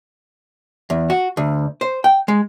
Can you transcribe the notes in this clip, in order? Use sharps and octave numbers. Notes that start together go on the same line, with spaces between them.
E2
F#4
D2
C5
G5
G#3